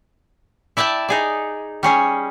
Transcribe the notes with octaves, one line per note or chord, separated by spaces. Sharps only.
E4 D5 E5 G5 A5
D#4 G#4 D5
G3 C#4 G#4